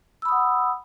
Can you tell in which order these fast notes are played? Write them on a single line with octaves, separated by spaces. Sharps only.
E6 B5 D#6 F#5